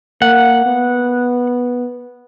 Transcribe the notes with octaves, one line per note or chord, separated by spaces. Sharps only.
A#3 F#5
B3